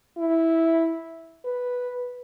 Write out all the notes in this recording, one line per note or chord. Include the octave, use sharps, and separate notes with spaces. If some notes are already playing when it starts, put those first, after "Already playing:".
E4
B4